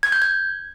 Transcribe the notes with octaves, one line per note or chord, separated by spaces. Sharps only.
G#6
G6
G#6